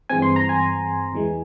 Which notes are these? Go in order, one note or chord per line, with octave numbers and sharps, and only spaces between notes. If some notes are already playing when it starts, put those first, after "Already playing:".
G2 E3 G#3 C4 G#5
C6
A#5
G#5
E2 E3 G#3